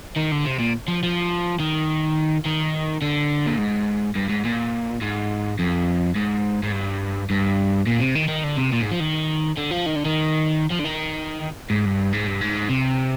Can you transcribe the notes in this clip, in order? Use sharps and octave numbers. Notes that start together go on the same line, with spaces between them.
D#3
D3
C3
A#2
F3
F3
D#3
D#3
D3
A#2
G#2
G2
G#2
A#2
G#2
F2
G#2
G#2
G2
G2
A#2
C3
D#3
D#3
D3
C3
A#2
G#2
F3
D#3
D3
F3
D#3
D3
D#3
F3
D3
D#3
G#2
G2
G#2
G2
G#2
C3